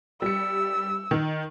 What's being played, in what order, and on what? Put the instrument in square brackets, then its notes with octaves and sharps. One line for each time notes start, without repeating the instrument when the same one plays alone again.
[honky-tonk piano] G3 C#7 [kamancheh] E6
[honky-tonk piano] D#3